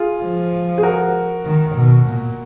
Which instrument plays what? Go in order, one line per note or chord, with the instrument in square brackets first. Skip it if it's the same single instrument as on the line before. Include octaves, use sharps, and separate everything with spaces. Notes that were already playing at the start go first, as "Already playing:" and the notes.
Already playing: [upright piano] F4 G#4
[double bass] F3
[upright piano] G#4
F#4 A#4
[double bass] D#3
B2
A#2